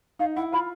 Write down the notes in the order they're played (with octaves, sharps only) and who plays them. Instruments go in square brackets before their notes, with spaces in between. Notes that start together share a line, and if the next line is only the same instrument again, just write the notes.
[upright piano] D#4 [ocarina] F5
[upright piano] E4 [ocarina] F#5
[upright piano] F4 [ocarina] B5